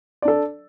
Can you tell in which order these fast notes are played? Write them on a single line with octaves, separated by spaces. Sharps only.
D5 D4 A4